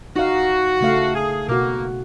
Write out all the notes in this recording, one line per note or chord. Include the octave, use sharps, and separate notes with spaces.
D#4 F#4 F5
C#3 A3 F5
G#4
B2 A#3 F#4